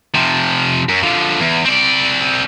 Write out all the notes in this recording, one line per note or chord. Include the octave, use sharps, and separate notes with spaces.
C3 F3
F#2
D3 F3
E2
C4 D5